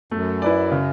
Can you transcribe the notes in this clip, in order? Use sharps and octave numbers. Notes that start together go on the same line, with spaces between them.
F#2 A3
E4 B4 D5
C#3